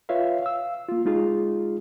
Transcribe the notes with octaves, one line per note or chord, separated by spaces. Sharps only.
F4 B4 C#5 E5 F5
F5 E6
A#3 F4
G#3 D#4 F4 G#4